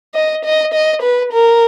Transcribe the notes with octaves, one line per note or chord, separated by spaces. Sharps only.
D#5
D#5
D#5
B4
A#4